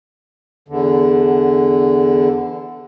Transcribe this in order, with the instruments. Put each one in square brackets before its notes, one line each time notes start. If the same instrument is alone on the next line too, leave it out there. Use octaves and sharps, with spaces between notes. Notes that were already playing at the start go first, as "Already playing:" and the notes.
[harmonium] E2 D3